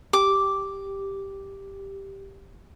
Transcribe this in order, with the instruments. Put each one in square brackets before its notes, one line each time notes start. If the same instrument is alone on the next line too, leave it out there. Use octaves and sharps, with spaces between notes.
[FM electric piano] G4 [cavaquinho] D6